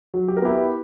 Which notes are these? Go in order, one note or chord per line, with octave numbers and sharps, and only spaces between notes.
F#3
G4
A#4
B3 E4 G4